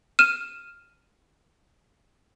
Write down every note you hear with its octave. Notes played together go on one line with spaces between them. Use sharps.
F6 D#7 E7